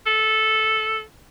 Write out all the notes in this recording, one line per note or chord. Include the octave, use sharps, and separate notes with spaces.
A4